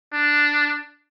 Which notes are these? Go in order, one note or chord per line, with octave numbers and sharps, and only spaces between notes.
D4